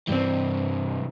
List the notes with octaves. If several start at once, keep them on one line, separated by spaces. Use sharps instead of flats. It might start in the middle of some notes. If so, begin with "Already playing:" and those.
G2 C3 E3 C4